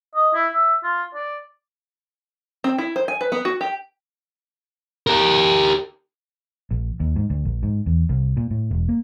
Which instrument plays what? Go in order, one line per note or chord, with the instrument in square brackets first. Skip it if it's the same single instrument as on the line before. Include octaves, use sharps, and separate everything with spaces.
[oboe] D#5
E4
E5
F4
D5
[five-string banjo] C4
E4
C5
G#5
B4
B3
F#4
G4
[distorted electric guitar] G4 A#4
[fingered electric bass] A#1
D#2
G#2
D2
A#1
G#2
E2
C2
A#2
A2
E1
A#3